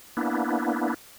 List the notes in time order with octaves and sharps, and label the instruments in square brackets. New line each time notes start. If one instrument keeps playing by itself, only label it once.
[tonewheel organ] A#3 B3 D4 E4